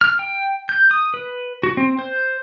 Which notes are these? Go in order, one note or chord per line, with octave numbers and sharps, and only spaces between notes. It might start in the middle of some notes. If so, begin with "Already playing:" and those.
F6
G5
G6
D#6
B4
F#4
C4
C5